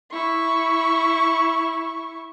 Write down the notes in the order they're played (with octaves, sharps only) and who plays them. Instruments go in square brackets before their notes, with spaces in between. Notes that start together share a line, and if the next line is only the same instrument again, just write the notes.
[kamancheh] E4 C#6